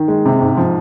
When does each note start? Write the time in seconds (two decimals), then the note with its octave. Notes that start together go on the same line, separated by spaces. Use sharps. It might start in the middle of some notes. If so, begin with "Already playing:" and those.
Already playing: D#3
0.08 G#3
0.26 C3
0.41 G#2
0.57 F3